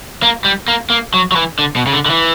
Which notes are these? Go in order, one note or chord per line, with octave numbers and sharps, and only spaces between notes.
A#3
G3
A#3
A#3
F#3
F#3
E3
D3
B2
C#3
D3
D3
E3